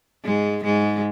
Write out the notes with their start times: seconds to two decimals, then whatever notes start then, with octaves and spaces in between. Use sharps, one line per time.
0.24 G#2 G#3
0.64 G#2 G#3